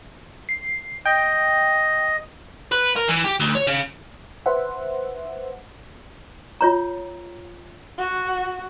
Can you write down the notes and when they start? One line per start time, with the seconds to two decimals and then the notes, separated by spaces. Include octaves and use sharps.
0.49 C7
1.05 D#5 G5
2.72 B4
2.96 A#4
3.08 E3
3.24 G4
3.40 D2
3.55 C#5
3.67 C#3
4.46 B4 C5 E5 F#5
6.61 F4 C#5 A#5
7.98 F#4